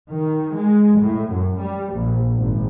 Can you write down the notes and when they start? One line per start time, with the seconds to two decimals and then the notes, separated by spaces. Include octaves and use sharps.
0.11 D#3
0.57 G#3
1.00 A2
1.32 F#2
1.63 G3
1.95 A#1
2.37 G#1